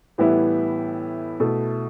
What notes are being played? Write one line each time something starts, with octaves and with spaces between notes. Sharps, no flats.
A2 E3 G3 B3 E4
B2 A3 E4 A4